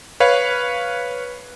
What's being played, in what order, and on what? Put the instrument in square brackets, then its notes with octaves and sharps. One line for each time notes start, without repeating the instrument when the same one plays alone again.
[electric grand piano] B4 C#5 F5